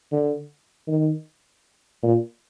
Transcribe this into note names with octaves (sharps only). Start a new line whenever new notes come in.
D3
D#3
A#2